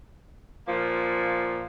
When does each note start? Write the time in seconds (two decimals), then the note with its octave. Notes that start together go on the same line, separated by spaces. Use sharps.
0.67 A#2 F3 A#3